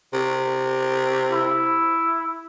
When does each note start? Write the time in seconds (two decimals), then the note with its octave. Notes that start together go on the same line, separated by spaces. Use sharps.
0.13 C3
1.32 E4